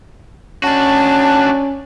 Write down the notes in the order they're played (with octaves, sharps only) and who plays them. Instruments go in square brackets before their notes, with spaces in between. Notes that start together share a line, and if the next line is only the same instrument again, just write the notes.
[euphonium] C#4 [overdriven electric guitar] D4 F#4 [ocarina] A5